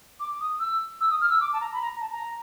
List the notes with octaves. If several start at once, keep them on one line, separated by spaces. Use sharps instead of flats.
D6
D#6
E6
E6
D#6
F6
E6
D6
A5
A#5
B5
A#5
A5
A#5